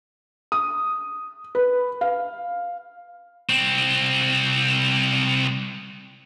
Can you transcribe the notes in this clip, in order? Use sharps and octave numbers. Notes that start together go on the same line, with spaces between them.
D#6
B4
F5
C2 C4